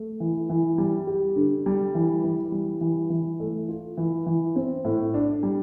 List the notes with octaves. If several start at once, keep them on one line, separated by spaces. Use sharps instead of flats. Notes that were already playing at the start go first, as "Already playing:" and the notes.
Already playing: A3
E3
E3
G3
G4
D3
G3
E3
E3
G3
E3
E3
A3
F4
E3
E3
C4
A2
D4
G3